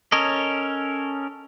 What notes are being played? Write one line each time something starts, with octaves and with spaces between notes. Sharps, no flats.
C#4 A4 A#4 C#5 D#5